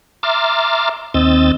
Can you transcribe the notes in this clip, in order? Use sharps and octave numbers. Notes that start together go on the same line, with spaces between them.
E5 A#5 C6 D6 F6 A6
D#2 C4 D#5 E6 G6 A6